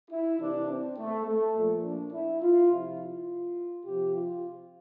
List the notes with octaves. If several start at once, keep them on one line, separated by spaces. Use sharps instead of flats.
E4
C3 E3 D4
C4
A3
A3
A#2 F3
D4
E4
F4
C3 F3 E4
F4
C3 F3 G4
F4